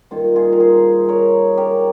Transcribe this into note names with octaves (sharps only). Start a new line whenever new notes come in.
G2 D#3 A#3 D#4 F4
F4 G#4
A#4
G#4 C5
A#4 C#5
G4 A#4